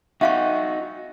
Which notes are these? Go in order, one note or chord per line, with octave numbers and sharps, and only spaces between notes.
D#4 F#4 E5 F5 C#6